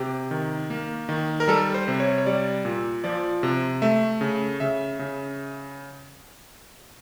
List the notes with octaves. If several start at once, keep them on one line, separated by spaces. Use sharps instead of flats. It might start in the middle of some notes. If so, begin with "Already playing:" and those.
Already playing: C3 G4
D#3
A#3
D#3
A#4
G3 A4
C5
C3
C#5
C#5
G3 D5
A#2
F3 D5
C3
A3 E5
C#3
C#3 E5
C#3